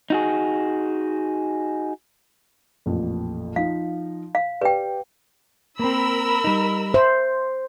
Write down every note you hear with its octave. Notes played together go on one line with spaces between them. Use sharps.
D#4 F#4 G#4
A1 F2 A#2
F3 D#4 F5
F5
G4 B4 D5 G5
A#3 C4 A#4 B5 E6
G3 D#4
C5 E5